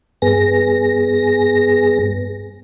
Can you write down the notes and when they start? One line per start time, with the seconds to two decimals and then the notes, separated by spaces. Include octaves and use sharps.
0.22 G2 B3 G#4 A#6